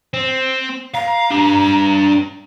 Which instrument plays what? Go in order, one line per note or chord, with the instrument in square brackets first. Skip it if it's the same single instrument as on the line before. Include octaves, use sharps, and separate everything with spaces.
[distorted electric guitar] C4
[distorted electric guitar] F5 [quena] A#5
[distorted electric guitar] D4 G4